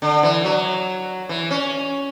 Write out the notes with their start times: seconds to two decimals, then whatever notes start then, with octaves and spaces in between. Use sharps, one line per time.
0.02 D3
0.23 E3
0.45 F#3
1.29 E3
1.51 C#4